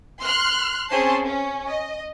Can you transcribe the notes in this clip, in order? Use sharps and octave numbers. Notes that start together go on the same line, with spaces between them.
C6 F6 F#6
C4 C#4 G#4 C5 A5 C6
C#4
D#5